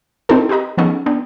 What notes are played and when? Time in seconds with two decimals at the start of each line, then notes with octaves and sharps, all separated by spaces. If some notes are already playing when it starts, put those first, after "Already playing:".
0.29 C4 D#4 E4 F#4 A4 A#4
0.49 G4 G#4 B4 D#5 A#5
0.77 F3 B3 C#4 D#4 G#4 A4
1.06 B3 D4 G5